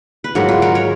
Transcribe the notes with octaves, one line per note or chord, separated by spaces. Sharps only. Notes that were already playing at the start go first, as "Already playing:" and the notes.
B4
G#2 F#3 A#3 F#4 A#4
F4 G#4
F#4 A#4
A#4 C#5